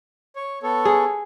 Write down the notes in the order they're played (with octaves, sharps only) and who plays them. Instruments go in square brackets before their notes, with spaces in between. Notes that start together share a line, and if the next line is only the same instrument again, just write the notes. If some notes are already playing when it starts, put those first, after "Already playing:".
[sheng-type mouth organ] C#5
B3 A4 C#5
[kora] G#4